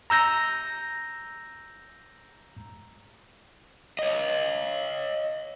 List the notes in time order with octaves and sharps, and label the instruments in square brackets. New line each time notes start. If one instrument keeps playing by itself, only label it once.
[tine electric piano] A#5 E6 G6 A#6
[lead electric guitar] C#5 D#5